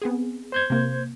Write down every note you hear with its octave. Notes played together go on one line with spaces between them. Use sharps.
B3 C4 G#4
C5 G6 G#6
C3 A#3